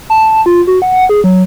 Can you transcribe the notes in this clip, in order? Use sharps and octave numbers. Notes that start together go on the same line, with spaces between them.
A5
F4
F#4
F#5
G#4
F#3